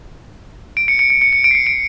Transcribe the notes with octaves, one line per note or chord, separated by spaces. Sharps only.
D7
C#7
C#7
C#7
C#7
C#7
D7
C7
C#7
D7